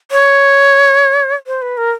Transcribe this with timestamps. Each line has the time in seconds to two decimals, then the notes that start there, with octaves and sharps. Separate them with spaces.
0.11 C#5
1.47 C5
1.62 B4
1.77 A#4